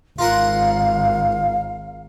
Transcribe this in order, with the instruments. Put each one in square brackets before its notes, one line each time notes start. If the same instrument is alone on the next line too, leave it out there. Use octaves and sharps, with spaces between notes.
[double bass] G#1 [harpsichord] F4 A#4 F#5 [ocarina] F5